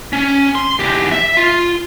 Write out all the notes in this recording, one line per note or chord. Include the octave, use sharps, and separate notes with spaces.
C#4
C6
E2 G4
E5
F4